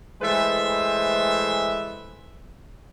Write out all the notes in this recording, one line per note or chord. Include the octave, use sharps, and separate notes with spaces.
E3 G#3 A3 B4 C5 E5